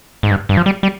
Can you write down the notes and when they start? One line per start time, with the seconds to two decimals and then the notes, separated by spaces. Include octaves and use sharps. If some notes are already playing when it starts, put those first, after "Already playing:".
0.23 G#2
0.31 G2
0.49 G2
0.57 F3
0.66 G3
0.83 G3